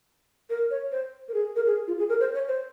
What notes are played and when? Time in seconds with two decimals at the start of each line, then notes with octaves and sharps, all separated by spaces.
0.50 A#4
0.70 C#5
0.92 C5
1.28 A#4
1.34 G#4
1.56 A#4
1.67 G#4
1.87 F4
1.99 G#4
2.09 A#4
2.20 C5
2.34 C#5
2.48 C5